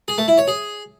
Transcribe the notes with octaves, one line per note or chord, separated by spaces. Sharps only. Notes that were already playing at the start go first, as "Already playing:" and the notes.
G#4
A3
E4
C#5
G#4